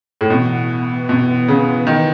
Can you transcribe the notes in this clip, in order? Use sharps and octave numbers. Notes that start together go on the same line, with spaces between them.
A2
B2 E3 B3 F#4
B2
C#3
D#3